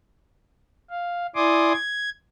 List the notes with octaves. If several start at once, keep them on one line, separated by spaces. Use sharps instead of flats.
F5
E4 D5 G#5 C6 D6 D#6
G#6